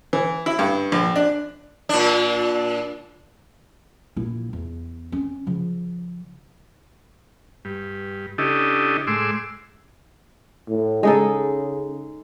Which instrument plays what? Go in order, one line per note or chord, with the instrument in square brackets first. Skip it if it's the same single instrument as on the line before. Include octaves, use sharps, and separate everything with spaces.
[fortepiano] E3
E4
G2
A#1
D4
[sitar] A#2 D4
[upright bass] A#1 E4
E2
C4 C#4
C#3 F3
[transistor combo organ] G2
C#3 D4 E4 G4 A4 D#5
A2 G#3 C6 D6 E6
[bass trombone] A2
[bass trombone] C#3 [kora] G#3 D#4 A4